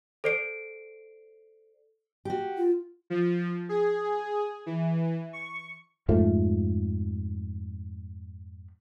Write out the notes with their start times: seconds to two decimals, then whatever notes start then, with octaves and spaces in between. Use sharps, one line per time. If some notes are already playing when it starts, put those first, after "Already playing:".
0.24 A4 C5 D5 C7 D7
2.25 F#4 G4
2.57 F4
3.10 F3
3.69 G#4
4.66 E3
5.33 C#6
6.09 F2 G#2 F3 A3